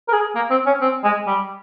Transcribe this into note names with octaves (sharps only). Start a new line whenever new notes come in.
A#4
G#4
A#3
C4
C#4
C4
G#3
G3